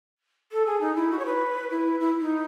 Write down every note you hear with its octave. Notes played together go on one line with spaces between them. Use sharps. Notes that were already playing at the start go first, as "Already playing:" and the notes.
A4
G#4
D#4
E4
F#4
C#5
B4
E4
E4
D#4